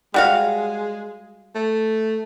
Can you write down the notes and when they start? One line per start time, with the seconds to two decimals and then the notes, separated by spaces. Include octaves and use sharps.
0.14 G3 G#3 F#4 F5
1.55 A3